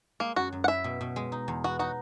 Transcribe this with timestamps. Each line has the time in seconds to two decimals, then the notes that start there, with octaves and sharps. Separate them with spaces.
0.20 G#3 A#3
0.36 F#2 F#4
0.53 F#2
0.64 F#5
0.68 E4 E5
0.84 B2
1.01 B2
1.16 G#3
1.32 D#4
1.48 E2
1.64 B3 F#4
1.79 D#4 F#4